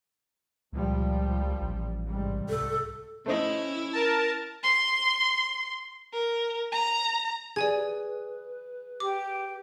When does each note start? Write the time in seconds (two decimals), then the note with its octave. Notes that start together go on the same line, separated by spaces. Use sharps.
0.73 C#2 A#2 F3 G3
1.60 A1
2.07 C2 G#2 G3
2.49 C2 A4
3.26 A3 C#4 E4 C5 D#5
3.93 A#4 A5
4.63 C6
6.13 A#4
6.72 A#5
7.56 G#4 B4 D5 G#5 G#6
9.00 G4 D6